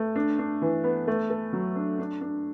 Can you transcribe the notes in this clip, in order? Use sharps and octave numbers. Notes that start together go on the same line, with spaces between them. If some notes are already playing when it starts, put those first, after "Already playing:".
Already playing: A3
D4
D4
E3
B3
A3
A4
F#3
D4
D4
D4